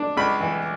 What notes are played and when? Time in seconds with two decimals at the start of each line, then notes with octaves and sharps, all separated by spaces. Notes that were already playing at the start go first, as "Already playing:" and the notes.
Already playing: D4
0.17 C#2 B5
0.41 E3